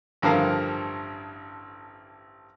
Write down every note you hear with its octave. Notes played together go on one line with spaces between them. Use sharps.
A1 G2 D3 F3 A#4 F5